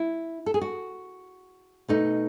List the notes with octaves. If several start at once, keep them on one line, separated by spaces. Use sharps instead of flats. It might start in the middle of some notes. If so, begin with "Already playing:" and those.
Already playing: E4
A4
G#4
F#4
B2 A3 D#4